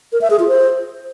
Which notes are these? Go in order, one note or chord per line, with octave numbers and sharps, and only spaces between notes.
A#4
E5
G#4
F4
C5